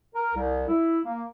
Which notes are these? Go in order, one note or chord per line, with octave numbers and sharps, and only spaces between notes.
A#4
C2
E4
A#3